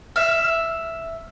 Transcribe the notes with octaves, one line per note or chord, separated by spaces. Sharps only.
E5 F6